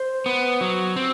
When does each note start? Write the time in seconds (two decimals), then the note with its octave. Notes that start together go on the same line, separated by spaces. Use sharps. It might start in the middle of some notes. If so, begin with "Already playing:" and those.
Already playing: C5
0.26 B3
0.61 F#3
0.96 C4